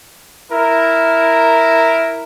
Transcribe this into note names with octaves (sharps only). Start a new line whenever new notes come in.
E4 A#4